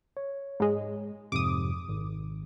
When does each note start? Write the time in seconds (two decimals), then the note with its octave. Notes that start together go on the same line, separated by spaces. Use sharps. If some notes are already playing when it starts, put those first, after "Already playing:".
0.17 C#5
0.60 G#2 G#3
1.32 F2 G#2 C3 D6 D#6
1.88 G#1